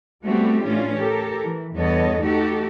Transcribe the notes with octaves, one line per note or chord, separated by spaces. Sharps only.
G3 A3 B3 C4 F#4 G4
A2 E3 C#4 D4 F4
G4 A4 A#4
E3
E2 G2 B3 A4 C#5 D#5
A3 D#4 F#4 G4 A4